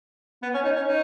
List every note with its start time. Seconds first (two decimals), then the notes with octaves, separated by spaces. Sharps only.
0.42 B3
0.54 C#4
0.64 D#4
0.76 C#4
0.87 D#4